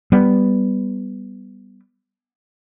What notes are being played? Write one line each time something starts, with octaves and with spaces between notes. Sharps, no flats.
G3 B3